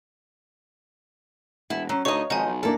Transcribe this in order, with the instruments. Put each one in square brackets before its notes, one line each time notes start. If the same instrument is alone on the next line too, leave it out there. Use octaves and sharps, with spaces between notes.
[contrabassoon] E1 [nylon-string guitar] B3 [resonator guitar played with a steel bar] E4
[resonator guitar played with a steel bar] F#3 [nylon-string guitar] C#4
[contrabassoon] D2 [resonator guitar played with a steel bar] D#4 D#5 [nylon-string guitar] B4 C#5 F5 [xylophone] C#6
[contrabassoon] G#1 [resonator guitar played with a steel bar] F3 D#4 [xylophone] F#5 G#5
[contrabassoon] B1
[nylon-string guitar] E2 A#3 D4 [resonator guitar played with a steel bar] A4